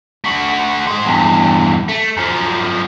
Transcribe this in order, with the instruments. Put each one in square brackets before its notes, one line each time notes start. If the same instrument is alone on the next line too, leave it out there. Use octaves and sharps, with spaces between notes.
[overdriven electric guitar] A3 F#4
G#3 C5
E2 G2
A3
F#2 F3